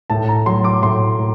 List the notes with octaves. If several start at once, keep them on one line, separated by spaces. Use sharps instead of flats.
A2 A5
A#5
F#3 C6
D6
A2 C6
A2